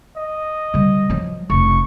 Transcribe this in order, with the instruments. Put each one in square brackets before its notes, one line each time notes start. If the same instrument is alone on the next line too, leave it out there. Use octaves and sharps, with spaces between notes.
[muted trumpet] D#5
[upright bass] D3 G3
F3 F#3
[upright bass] F1 B2 [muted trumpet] C#6